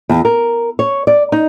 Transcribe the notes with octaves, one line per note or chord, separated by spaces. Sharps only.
E2
A#4
C#5
D5
D#4